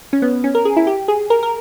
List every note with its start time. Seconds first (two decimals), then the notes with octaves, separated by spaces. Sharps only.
0.13 C#4
0.22 B3
0.44 C#4
0.55 A#4
0.65 G#4
0.77 E4
0.87 G4
1.08 G#4
1.30 A#4
1.43 A#4